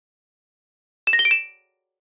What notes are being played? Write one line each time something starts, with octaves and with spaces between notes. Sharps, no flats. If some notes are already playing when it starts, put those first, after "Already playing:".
E7
A#6
G7
D7
E7